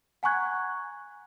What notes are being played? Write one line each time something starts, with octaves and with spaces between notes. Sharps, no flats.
F#5 G#5 A#5 C#6 F#6 G#6